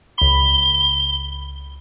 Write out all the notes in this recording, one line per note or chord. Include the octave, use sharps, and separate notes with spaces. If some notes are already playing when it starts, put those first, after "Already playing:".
C#2 B5 G7